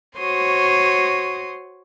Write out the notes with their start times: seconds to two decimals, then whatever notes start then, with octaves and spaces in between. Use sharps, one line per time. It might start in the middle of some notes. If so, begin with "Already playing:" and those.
0.18 F#4 C5 C#5 C6 D#6